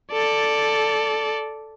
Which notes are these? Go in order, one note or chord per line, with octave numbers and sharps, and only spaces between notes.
A4 D5